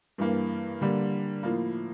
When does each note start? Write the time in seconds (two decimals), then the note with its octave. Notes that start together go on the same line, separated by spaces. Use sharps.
0.18 G2 E3 A#3
0.81 D3 G3 A#3
1.43 A2 F3 A#3